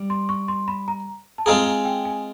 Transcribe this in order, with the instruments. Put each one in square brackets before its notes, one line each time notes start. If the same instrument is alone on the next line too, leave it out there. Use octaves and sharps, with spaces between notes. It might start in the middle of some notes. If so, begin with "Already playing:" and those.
Already playing: [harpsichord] G3
[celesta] C6
C#6
C6
B5
A#5
A5
[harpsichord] G#3 C4 F4 G#4 [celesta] A#5
[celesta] G#5
G5
G#5